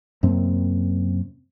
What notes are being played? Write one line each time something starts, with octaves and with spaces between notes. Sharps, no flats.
F#2 C3 A#3 C4